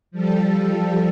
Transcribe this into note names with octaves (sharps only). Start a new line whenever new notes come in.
F3 G3 A4